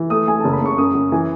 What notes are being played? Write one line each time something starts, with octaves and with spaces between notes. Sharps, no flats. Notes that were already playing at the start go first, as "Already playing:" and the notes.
Already playing: E3
A3 D#6
A3 G#5
F#1 A5
B5
C#3 C#6
F#2 D#6
F#2
E3 G#5